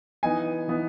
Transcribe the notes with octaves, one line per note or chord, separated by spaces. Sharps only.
E3 B3 D#4 G#5
E3 B3 D#4